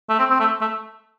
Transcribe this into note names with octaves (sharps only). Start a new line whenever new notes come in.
A3
C4
C4
A3
A3